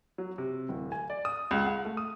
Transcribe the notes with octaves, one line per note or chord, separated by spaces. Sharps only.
F#3
C3
D1
G#5
D5
D#6
C#2
F#5
A3
D#6